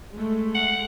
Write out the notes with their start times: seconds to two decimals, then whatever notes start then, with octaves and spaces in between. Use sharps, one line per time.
0.13 G#3 A3
0.55 F#5